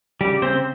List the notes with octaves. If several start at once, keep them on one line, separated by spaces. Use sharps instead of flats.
C#3 G3 G4
C#3 C4 C5